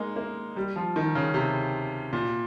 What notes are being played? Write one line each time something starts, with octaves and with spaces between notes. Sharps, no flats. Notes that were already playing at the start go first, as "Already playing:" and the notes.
Already playing: G#3 A#3 D#4
A#3
G3
F3
D#3
C#3
C3
A#2